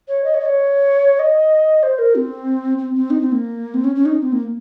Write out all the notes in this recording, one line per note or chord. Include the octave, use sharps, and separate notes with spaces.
C#5
D#5
C#5
D#5
C#5
D#5
C5
A#4
C4
C4
C4
D#4
C4
A#3
C4
C#4
C#4
D#4
C4
A#3